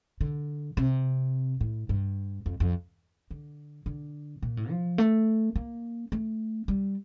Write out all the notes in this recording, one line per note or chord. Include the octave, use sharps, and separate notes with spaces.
D3
C3
A2
G2
F2
F2
D3
D3
A#2
A2
F3
A3
A#3
A3
G3